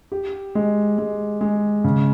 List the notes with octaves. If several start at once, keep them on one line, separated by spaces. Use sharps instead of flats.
G4
G#3
G#3
G#3
C#3